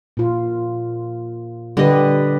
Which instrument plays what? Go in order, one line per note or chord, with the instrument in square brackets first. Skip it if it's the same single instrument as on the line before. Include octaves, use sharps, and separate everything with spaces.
[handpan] A#2 F4
[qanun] D3 D#5 [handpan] G3 G4 B4